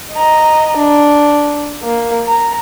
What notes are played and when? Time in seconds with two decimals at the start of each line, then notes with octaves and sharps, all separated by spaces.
0.13 D#5 A#5
0.77 D4
1.83 A#3
2.27 A#5